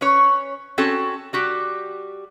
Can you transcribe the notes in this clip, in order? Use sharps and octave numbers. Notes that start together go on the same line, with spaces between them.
C#4 B4 C#5
C4 C#4 F#4 A4
G3 F#4 G4